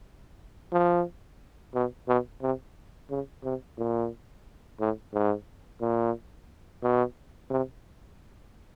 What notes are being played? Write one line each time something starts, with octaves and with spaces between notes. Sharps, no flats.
F3
B2
B2
C3
C#3
C3
A#2
A2
G#2
A#2
B2
C3